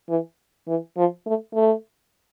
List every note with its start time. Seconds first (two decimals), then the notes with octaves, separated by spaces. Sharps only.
0.09 E3
0.68 E3
0.97 F3
1.26 A3
1.55 A3